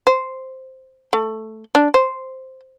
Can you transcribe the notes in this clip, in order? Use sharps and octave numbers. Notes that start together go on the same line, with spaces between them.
C5
A3
D4
C5